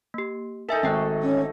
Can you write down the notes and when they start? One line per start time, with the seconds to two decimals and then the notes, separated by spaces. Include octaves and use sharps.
0.14 A#3 G4
0.69 D#4 A4 A#4 E5 G#5
0.83 G#1 A3 E5 G5 F#6
1.22 C#4